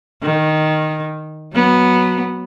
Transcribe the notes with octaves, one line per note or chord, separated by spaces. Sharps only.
D#3
F#3 B3